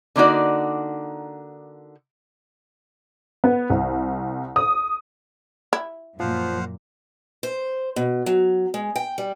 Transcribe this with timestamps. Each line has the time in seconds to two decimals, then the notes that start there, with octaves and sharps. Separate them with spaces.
0.16 D3 A#3 D#4 F#4 D5
3.44 B3
3.70 C2
4.56 D#6
5.73 E4
6.20 F#2 A#2 F3 C5 F5 F#5
7.43 C5
7.96 B2
8.26 F#3
8.74 G#3
8.96 G5
9.18 G3